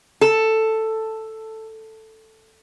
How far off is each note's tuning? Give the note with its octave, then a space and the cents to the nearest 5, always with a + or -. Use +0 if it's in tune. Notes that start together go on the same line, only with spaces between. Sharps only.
A4 +5